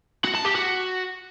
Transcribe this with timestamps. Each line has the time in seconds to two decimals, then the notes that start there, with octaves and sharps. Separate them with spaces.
0.25 F#4
0.35 A5
0.45 G4
0.55 F#4